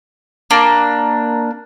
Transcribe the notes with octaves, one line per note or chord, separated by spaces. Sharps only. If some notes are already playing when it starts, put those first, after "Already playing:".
A#3 D4